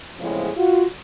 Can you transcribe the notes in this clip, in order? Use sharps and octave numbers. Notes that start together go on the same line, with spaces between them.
E2 A2 C#3 F3 G#3 C4
F4 F#4